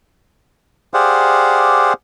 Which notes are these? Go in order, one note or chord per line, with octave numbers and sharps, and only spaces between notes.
G4 G#4 C5 D5 F5 F#5